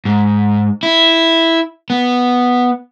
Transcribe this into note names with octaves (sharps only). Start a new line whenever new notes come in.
G#2
E4
B3